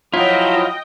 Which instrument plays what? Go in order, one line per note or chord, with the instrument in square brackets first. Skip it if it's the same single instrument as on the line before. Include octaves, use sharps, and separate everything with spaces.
[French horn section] F3 F#3 [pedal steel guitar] E4 [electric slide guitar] F4 [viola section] D#5 G5